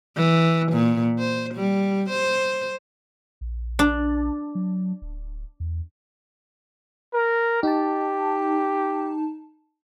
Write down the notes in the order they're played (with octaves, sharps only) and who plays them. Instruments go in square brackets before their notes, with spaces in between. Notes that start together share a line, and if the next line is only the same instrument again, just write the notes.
[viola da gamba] E3
A#2
C5
G3
C5
[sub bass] A#1
[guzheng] D4
[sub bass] F#3
D1
E2
[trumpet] A#4
[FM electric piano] D#4 A5 [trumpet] G4